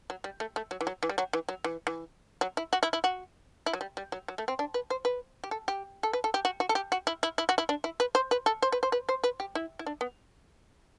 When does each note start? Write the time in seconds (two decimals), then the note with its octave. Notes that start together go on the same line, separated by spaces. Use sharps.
0.10 F#3
0.24 G3
0.40 A3
0.56 A3
0.71 F#3
0.81 E3
0.87 F#3
1.03 E3
1.09 G3
1.18 F#3
1.33 E3
1.49 F#3
1.64 E3
1.87 E3
2.41 F#3
2.57 E4
2.73 F#4
2.83 E4
2.93 E4
3.04 F#4
3.66 E4
3.73 F#3
3.81 G3
3.97 G3
4.12 F#3
4.28 F#3
4.38 A3
4.48 C4
4.59 D4
4.74 B4
4.90 C5
5.05 B4
5.44 G4
5.51 A4
5.68 G4
6.03 A4
6.13 B4
6.24 A4
6.34 G4
6.45 F#4
6.60 F#4
6.69 A4
6.75 G4
6.92 F#4
7.07 E4
7.23 E4
7.38 E4
7.49 F#4
7.58 E4
7.69 D4
7.84 E4
8.00 B4
8.15 C5
8.31 B4
8.46 A4
8.62 C5
8.72 B4
8.83 C5
8.92 B4
9.09 C5
9.24 B4
9.40 G4
9.55 E4
9.79 E4
9.86 D4
10.01 B3